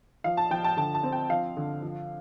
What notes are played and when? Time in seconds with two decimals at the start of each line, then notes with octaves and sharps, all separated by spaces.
0.24 F3 F5
0.37 A5
0.51 F3 G5
0.64 A5
0.77 D3 A5
0.95 A5
1.03 C4
1.12 G5
1.29 F3 F5
1.57 D3
1.82 F3